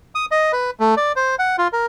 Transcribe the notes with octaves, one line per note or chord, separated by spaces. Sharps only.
D#6
D#5
B4
A3
D5
C5
F#5
F4
A#4